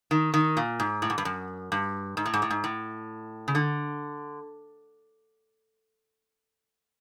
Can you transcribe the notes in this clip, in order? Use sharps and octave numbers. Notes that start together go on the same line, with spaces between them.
D#3
D#3
A#2
G#2
A2
G#2
G2
F#2
G2
G#2
A2
G#2
A2
G#2
A2
C#3
D3